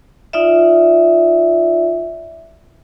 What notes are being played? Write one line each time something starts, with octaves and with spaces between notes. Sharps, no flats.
D#4 F4 D5 E5